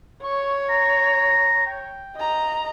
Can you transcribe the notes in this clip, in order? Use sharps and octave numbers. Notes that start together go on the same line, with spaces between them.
C#5 C#6
A#5
G5
D#5 A#5